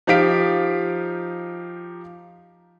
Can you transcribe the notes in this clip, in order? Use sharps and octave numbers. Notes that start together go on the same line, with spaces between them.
F3 D#4 G4 F5 B6 D7